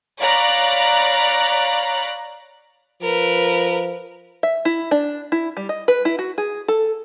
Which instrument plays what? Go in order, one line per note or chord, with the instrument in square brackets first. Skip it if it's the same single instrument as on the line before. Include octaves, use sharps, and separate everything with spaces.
[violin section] C#5 D5 F5 A#5 B5 F#6
[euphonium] F3 [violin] A#4 B4
[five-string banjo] E5
E4
D4
E4
G3
D#5
B4
E4
F#4
G#4
A4